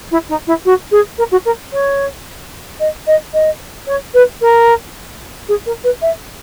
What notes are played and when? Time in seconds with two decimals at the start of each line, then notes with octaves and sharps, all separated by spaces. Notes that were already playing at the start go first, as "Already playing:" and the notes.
0.11 E4
0.29 D#4
0.47 E4
0.65 F#4
0.91 G#4
1.18 A#4
1.32 F#4
1.45 A#4
1.73 C#5
2.80 D#5
3.07 D#5
3.34 D#5
3.87 C#5
4.14 B4
4.41 A#4
5.49 G#4
5.66 A#4
5.84 B4
6.02 E5